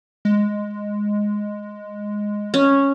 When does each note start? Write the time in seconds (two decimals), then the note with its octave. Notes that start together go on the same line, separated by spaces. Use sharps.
0.25 G#3
2.54 C#4